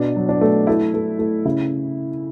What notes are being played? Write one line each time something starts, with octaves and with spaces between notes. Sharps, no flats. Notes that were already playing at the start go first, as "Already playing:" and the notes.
Already playing: B2 D4
F#3
D4
A3
A3 E4
A3
A3
C#3 E4